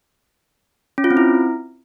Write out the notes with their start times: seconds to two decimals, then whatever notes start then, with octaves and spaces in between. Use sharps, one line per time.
0.98 C#4
1.04 F4
1.11 C4
1.17 E4